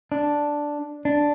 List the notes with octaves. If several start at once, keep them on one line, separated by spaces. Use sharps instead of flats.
D4
D4